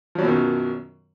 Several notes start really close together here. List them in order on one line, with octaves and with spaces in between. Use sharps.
F3 F#3 B2 F#2 D#3